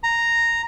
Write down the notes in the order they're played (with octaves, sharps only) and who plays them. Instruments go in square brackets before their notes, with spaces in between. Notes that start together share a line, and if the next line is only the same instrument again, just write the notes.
[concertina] A#5